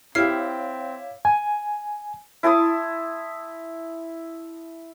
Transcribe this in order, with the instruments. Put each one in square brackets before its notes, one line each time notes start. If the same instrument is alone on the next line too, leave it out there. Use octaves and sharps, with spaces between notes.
[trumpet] C4 [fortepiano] E4 G4 [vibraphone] C#5 F5 [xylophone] F6 C7
[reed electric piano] G#5
[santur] E4 A5 C6 D#6